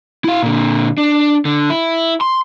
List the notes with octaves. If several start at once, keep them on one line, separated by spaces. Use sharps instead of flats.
E4 F5
A#2 D3
D4
D3
E4
C6